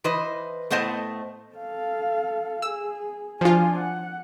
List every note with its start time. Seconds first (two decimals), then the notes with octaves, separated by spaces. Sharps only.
0.04 E3 B4 C5 D#5
0.70 A2 A3 B3 C5 D#5 A5
1.55 A4 F5
2.62 G#4 E6
3.41 F3 D4 F4 G#5
3.78 F#5